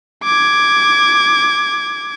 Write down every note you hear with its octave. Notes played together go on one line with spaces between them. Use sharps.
D6 G#6